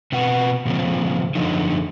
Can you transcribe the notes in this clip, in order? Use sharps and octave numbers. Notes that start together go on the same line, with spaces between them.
B2 C4 F#4 B4 F#5
A#2 C#3 F3 C4
F#2 D3 F3 F#3 D#4